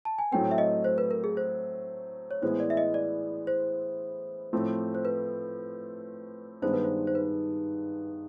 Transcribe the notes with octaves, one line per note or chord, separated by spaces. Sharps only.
A5
G#5
A2 F#3 A3 C4 G5
E5
D#5
C5
B4
A#4
G#4
C5
C#5
A2 E3 G#3 B3 E4 C5
D5
E5
D#5
D5
C5
A2 F3 A3 C4
C5
B4
G2 D#3 G#3 B3 D4 C5
B4
C5
C5
B4